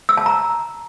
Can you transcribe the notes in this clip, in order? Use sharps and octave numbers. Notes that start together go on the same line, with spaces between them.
E6
A5
A#5